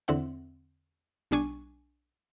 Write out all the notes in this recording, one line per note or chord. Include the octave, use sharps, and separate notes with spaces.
E2 D3 C4 E5 F#5
B1 G3 D4 G#5 C#6